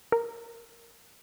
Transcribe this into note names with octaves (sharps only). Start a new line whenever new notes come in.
A#4